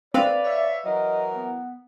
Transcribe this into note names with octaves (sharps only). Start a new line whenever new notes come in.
C4 B4 D5 F5
C#5 E5
E3 F#3 A#4 D#5
B3